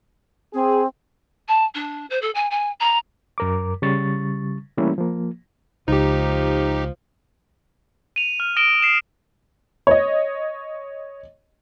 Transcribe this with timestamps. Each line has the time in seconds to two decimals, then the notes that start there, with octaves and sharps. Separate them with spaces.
0.54 C4 G#4
1.48 A5
1.75 D4
2.10 C5
2.22 A4
2.35 G#5
2.50 G#5
2.80 A#5
3.38 F#2 A#4 D6
3.82 C#3 G3 C#6 A6
4.78 E3 G3 A3 A#3 C#4 E4
4.98 F3 A#3
5.88 C#2 F3 D#4 G4
8.16 D#7 F7
8.40 F6
8.56 D#6 A#6 D7 E7 G7
8.82 C7 E7
9.87 C#5 D#5